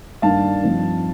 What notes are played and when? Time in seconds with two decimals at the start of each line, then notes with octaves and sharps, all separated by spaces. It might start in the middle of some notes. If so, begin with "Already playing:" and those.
0.22 G2 D#3 A#3 D4 F5 A5
0.63 G2 F3 C4 D#4